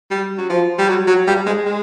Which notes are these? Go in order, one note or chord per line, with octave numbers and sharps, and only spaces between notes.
G3
F#3
F3
G3
F#3
F#3
G3
G#3
G#3